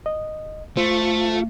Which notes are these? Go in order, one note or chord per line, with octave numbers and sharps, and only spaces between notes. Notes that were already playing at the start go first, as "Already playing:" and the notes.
D#5
A3 F4 C5